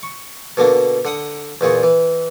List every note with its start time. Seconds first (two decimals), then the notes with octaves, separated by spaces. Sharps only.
0.03 C#6
0.57 B2 D3 A#3 D4
1.05 D3 F#5 D#6
1.61 E2 A#2 G#4 C#6
1.83 E3